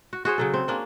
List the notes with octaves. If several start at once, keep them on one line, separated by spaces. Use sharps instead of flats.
F#4
F#4 G#4 C5 C#5
C#3 F#3 A4
C4
A#3 C#4 D4